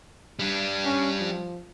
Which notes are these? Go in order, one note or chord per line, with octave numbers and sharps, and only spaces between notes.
G3 D4
C#4
F3